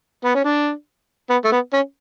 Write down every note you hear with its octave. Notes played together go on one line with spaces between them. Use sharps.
B3
C#4
D4
B3
A3
B3
C#4